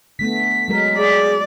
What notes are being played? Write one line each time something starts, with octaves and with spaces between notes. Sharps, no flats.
D3 A3 B3 B6
F#3 G#3 A#4
G#4 D5